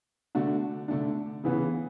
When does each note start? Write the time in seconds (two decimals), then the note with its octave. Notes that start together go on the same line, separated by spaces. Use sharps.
0.35 D3 A3 D4 F#4
0.88 D3 A3 D4
1.44 C#3 E3 B3